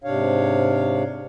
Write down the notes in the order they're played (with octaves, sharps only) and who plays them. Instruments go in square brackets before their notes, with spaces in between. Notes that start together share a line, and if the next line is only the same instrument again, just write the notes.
[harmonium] G#2 C3 D4 C#5 F5